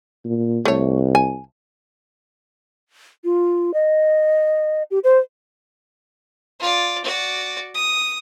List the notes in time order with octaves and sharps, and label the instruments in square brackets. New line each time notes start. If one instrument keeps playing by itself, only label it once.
[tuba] A#2
[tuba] C2 [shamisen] A3 C#5
[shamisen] G#5
[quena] F4
D#5
G4
C5
[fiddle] F4 D5
F#4 D5
D#6